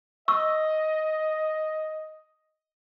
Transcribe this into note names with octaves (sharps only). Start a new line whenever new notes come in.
D#5 C#6 E6